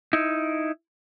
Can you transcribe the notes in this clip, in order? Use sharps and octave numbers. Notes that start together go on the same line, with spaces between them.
D#4 E4